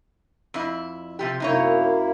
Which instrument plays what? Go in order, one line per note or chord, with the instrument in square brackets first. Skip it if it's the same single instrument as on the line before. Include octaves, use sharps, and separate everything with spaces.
[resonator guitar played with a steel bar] F2 E4
C3 F3 G4
[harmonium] F#2 A#3 E4 [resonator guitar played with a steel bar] C3 D#4 C#5